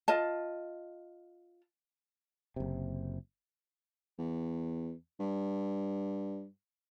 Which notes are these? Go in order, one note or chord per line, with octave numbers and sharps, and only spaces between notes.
F4 D#5 A5
F#1 C3
E2
G2